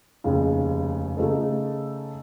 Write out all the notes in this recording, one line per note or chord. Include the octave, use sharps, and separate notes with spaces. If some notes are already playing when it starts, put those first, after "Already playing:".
F1 D#2 C#3
C#3 A3 D#4 A4